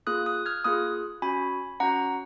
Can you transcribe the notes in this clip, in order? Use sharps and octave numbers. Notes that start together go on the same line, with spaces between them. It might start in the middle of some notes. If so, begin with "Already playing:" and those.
A#3 F4 G#4 D#6 F#6
D#6 F#6
F6 G#6
A#3 F4 G#4 D#6 F#6
C#4 F#4 G#5 B5
C#4 F#4 F#5 A#5